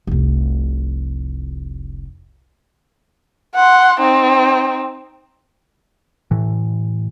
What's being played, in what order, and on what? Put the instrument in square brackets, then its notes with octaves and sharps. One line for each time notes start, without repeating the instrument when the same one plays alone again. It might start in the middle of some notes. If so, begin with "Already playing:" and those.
[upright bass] F1 C2
[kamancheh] F#5 C6
C4 D#4
[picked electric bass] A2 E3